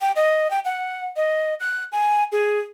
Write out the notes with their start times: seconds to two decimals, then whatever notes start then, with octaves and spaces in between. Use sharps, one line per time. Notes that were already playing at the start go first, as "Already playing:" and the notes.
0.01 G5
0.16 D#5
0.51 G5
0.65 F#5
1.16 D#5
1.60 F#6
1.92 G#5
2.32 G#4